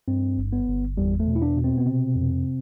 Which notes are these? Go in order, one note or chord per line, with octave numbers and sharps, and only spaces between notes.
G2 C4
G1
B3
G1
E2 G3
A3
B2
E4
D4
B2
C4
B3
C3 C4
F2